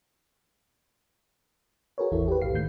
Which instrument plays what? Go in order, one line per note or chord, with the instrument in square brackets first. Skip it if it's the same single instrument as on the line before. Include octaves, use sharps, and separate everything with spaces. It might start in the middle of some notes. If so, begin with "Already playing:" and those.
[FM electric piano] F#4 G#4 A#4 B4 C#5
G#1 E2 E3 E4 A4
G4 B4
B1 G#2 F5 C7
D2 G#2 D#3 A3 G6 C7